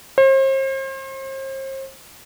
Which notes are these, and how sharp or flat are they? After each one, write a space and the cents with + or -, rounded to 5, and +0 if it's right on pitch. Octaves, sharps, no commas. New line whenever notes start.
C5 +40